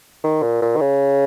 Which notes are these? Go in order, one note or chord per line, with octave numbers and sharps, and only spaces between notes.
D#3
A#2
A#2
D#3
C#3